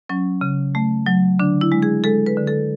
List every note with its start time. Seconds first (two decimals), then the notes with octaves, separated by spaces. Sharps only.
0.09 F#3 C#4
0.41 C#3
0.75 A3
1.07 F#3
1.39 D3 D4
1.61 E4
1.72 G#3
1.82 G#4
2.04 G#3 A4
2.26 B4
2.37 D3
2.48 A4